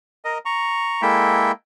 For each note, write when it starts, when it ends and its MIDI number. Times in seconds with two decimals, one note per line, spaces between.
0.25 0.38 70
0.25 0.38 75
0.45 1.02 82
0.45 1.02 85
1.02 1.52 56
1.02 1.52 58
1.02 1.52 64
1.02 1.52 69
1.02 1.52 76
1.02 1.52 79